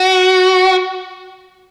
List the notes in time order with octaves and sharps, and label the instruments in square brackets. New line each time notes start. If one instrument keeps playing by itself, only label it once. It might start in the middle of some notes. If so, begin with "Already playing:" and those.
Already playing: [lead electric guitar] F#4